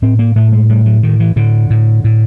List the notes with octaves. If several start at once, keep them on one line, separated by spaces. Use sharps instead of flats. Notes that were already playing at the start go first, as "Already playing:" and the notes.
A2 C4
A#3
A2 A3
G#3
A2 G3
F#3
A2 D#3
E3
A2 D3
A2
A2